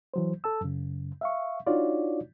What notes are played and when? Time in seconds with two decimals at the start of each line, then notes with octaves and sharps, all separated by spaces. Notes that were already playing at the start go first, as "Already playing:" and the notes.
0.14 E3 F#3 C5
0.44 A4 A5 E6
0.61 F#2 C#3
1.21 E5 F5 C#6
1.67 D4 D#4 F4 F#4 C#5 D5